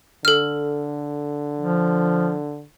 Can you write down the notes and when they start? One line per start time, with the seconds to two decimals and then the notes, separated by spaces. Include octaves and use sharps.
0.25 D3 A4 F6
1.60 F3